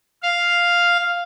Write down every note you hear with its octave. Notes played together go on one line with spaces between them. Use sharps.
F5